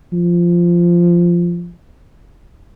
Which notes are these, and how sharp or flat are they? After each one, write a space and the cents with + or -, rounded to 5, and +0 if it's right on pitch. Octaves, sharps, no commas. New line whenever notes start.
F3 -10